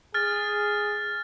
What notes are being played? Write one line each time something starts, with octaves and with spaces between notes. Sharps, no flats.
G#4 F6 A6